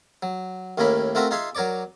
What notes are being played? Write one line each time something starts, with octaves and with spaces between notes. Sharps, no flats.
F#3
D#2 A2 A#3 C#4 A#4 B5
A3 C4 F4 F#4 A#4 E5
D#4 F4 G#4 E5 C6
F#3 A#4 C#5 D5 D6